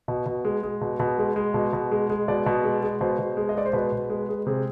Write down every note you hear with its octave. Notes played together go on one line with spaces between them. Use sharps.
B2
B2
G#3
G#3
B2
B2
G#3
G#3
B2
B2
G#3
G#3
B2 D5
B2
G#3
G#3
B2 C5
B2
G#3
D#5
G#3 D5
C5
B2 B4
B2
G#3
G#3
C3 G#4